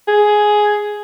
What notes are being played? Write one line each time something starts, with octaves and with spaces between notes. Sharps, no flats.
G#4